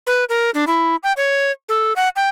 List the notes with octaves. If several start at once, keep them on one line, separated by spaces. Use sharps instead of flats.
B4
A#4
D4
E4
G5
C#5
A4
F#5
G5